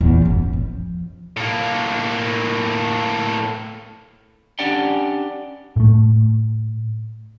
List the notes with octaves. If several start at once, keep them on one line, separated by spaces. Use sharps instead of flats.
E2 A#2
F#2 D#3
F3
A2 A#3
C#4 D4 G4 D5 F#5 G5
A2 A3